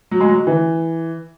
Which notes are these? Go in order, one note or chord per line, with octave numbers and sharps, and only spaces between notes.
F#3
G#3
F#3
E3